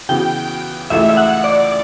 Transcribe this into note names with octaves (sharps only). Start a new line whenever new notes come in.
C#3 E3 B3 F#4 G5
C#2 C#3 E3 A3 E5
E5
F#5
D5